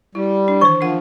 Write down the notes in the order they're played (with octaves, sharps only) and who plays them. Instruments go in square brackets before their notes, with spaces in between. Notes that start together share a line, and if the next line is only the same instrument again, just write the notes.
[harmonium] G3 [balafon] E4
[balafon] D4
[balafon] D#3 E3 C5 [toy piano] C#6
[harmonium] F3 [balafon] D4 A#4 F#5